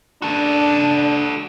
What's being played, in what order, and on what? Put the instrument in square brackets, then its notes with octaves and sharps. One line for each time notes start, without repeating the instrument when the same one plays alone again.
[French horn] D4 [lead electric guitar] F#4 A4